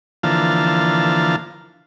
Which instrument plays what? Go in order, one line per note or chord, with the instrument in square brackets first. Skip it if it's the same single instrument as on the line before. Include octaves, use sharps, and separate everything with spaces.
[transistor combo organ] D3 E3 F3 A#3 F5 A5